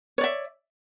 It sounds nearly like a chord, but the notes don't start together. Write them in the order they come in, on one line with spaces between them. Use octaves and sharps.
C#5 D5 E5